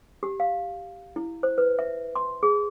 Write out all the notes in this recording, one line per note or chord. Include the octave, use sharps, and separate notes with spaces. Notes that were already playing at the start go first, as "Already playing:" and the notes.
G4
F5
E4
C5
B4
E5
C6
G#4